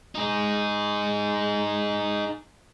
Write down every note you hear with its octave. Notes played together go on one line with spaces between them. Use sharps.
D#4 G#4